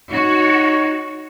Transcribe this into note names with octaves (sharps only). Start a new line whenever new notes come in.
D#4 F#4 C#5